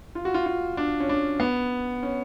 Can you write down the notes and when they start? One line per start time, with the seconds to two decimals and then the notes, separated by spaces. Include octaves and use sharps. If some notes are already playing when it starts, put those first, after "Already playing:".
0.15 F4
0.25 F#4
0.34 F4
0.46 F4
0.77 D4
1.00 C#4
1.09 D4
1.40 B3
2.03 C#4